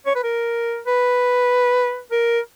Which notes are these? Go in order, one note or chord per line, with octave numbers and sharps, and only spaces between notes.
C#5
B4
A#4
B4
A#4